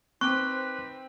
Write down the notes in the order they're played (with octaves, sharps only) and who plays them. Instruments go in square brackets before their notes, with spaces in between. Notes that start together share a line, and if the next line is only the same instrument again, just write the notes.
[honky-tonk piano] C4 [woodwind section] D#4 B4 C5 [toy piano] C#6 [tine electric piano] D6 F#6